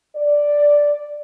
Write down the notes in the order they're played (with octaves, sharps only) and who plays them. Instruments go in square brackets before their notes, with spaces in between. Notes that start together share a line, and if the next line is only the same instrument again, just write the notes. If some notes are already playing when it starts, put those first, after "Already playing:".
[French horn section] D5